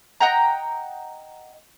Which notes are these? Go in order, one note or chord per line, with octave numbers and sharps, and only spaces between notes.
D#5 F#5 G5 A#5